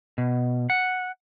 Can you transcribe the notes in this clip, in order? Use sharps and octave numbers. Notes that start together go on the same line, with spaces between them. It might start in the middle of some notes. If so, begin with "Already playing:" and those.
B2
F#5